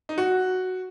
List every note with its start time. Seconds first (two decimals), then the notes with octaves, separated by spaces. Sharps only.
0.09 D#4
0.18 F#4